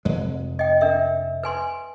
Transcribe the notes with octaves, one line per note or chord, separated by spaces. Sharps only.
F1 F2 G#3
D#5 G5
D4 A#4 E5
B4 G#5 C6